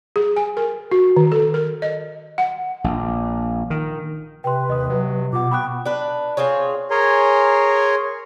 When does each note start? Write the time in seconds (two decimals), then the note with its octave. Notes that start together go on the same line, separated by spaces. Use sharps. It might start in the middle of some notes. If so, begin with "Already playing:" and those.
0.16 G#4
0.36 G#5
0.57 A#4
0.92 F#4
1.16 D#3
1.32 A4
1.54 A#4
1.82 D#5
2.38 F#5
2.84 A#1
3.70 D#3
4.44 C3 B4 G5 C6
4.70 D#2 D#5 D#6
4.90 F#3
5.33 B2 F4 F#5 D6
5.51 G5 B5 C#6 D#6 F#6
5.86 D4 B4
6.37 C4 F4 G#4 C#5
6.91 G#4 A#4 C#5 G#5 A#5 C6